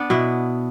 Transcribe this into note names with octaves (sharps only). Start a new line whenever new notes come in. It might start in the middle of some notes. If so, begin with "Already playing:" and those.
Already playing: B3 D4
B2 E4